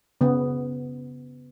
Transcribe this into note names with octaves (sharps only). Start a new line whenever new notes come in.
C#3 B3